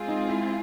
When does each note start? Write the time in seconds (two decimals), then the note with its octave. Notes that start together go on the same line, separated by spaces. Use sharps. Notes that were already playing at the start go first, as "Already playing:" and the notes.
Already playing: G#3 C4 F4 G#4
0.08 D#4
0.28 E4